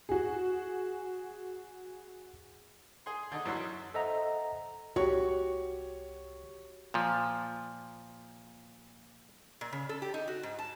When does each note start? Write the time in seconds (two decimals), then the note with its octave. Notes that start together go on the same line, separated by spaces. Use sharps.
0.09 F#4 G#4
3.06 G#4 C6
3.32 D3 D#4
3.45 F#2 E3 F#3 F#5 C6 E6
3.94 A4 C5 D#5 E5 F#5 A#5
4.96 C2 F#4 G4 C#5 C#6
6.94 A#2 F3
9.61 A#2
9.72 C#3
9.89 A4
10.02 G4
10.14 D#4
10.28 F#4
10.43 G#2
10.59 A5